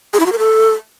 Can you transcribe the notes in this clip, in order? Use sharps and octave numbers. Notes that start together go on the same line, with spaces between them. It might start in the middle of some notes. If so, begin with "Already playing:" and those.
G#4
E4
F#4
A#4
A4